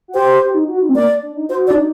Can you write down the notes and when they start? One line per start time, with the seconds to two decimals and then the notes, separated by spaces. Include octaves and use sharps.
0.08 F#4
0.14 G4 C5
0.42 G4
0.55 D#4
0.68 F#4
0.82 D#4
0.89 C4
0.95 A#3 D5
1.23 D4
1.36 D#4
1.49 F#4 C5
1.67 D5
1.70 D4
1.75 D#4